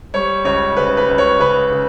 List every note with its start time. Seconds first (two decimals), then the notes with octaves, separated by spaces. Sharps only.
0.14 G3 C#5
0.44 C#2 C#5
0.76 C#3 B4
0.97 B4
1.08 C#2
1.18 C#5
1.39 C#3 B4
1.71 C#3